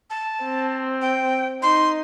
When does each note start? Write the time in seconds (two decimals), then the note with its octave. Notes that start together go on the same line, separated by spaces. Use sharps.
0.10 A5
0.45 C4
1.01 G5
1.63 D#4 C6